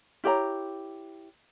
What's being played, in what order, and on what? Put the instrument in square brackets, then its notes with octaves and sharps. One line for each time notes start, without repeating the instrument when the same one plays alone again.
[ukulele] E4 G4 C#5 A#5